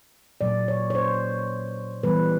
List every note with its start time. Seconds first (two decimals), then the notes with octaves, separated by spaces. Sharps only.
0.41 A#2 F#3 A#3 D5
0.68 C#5
0.90 C#5
0.95 C5
2.03 E3 G3 B3 B4